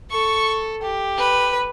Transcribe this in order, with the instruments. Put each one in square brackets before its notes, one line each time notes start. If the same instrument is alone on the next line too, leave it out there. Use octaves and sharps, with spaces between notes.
[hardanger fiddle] A4 [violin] C#6
[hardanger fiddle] G4
[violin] B4